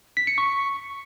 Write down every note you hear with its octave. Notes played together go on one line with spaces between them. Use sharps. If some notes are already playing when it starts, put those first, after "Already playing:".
B6
C#7
C#6